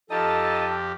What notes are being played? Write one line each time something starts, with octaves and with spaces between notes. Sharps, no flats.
F2 D#4 F4 G4 A4 D#5 A5